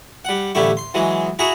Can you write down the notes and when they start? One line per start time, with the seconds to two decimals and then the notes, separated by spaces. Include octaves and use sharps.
0.25 G3 F#5
0.55 A1 D3 G3 E4 C#6
0.77 C6
0.94 E3 F#3 G#3
1.39 E4 F#4 G#4 F#5 A#5